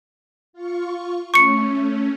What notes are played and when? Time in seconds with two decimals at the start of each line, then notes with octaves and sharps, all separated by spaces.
0.53 F4 C#6
1.34 A3 C#4 C#6 C#7